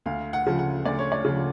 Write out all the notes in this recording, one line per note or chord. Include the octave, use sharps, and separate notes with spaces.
D2 F5
F#5
C#3 F3
F#5
D2 D5
C#5
D5
C#3 F3